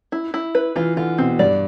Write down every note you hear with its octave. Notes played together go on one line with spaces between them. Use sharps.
E4
E4
B4
E3 F4
D3 F4
B2 C4
G2 D5